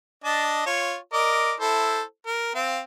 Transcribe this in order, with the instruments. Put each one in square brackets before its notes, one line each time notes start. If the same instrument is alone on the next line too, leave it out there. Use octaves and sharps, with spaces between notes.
[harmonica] D4 D#5 A5
F4 C#5
A#4 D5 D#5
E4 A4 C5
A#4
C4 F5